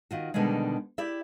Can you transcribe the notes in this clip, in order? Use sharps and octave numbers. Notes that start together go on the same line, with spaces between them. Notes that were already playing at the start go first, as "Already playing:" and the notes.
D#3 F4 F#4
B2 D3 D#3 G3 G#3
E4 G4 D5 E5